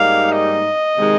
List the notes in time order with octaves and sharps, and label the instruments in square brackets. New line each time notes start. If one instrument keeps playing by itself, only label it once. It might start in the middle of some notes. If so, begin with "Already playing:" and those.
Already playing: [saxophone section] G#2 G3 A#3 D#4 [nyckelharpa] F5
[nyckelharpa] D#5
[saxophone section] C3 D#3 G#3 D#4